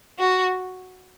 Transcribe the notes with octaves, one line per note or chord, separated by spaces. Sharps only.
F#4